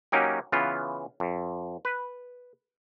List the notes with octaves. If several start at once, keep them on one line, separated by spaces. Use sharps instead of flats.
F#3 A#3 C#4 D#4 G4
C#3 E3 B3 F4
F2
B4